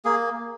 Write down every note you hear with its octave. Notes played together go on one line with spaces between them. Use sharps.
A#3 G#4